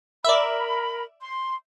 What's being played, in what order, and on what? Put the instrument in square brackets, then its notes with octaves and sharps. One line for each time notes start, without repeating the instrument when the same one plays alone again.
[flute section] A#4 B5 [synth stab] D5 E5
[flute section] C6